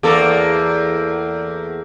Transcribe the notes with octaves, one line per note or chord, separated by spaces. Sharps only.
E2 A#3 A4